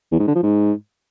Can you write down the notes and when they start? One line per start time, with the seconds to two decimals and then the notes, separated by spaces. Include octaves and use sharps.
0.12 E2
0.20 G#2
0.27 D3
0.35 F3
0.43 G#2